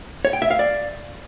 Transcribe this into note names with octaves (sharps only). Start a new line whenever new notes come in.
C#5
G5
E5
F5
D5